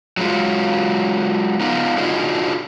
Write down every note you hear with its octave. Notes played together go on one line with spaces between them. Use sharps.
F#3 G#3 F4
B3 D#4 F4
D4 D#4 F4 F#4 G#4 D#5